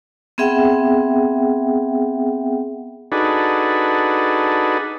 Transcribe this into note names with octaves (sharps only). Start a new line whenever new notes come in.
B3 C4 G#4 E5 F#5 G5
D4 D#4 F#4 G#4 A4 B4